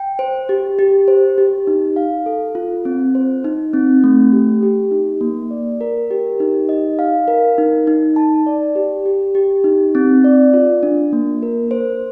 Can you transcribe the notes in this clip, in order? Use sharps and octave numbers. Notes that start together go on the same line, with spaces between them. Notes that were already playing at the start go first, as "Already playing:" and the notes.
Already playing: G5
C5
G4
G4
C5
G4
D#4
F5
A4
F4
C4
C5
D#4
C4
A3
G4
G4
D#4
A#3
D5
A#4
G4
D#4
D#5
F5
A#4
D#4
D#4
A5
D5
G4
G4
G4
D#4
C4
D5
F4
D4
A#3
A#4
C5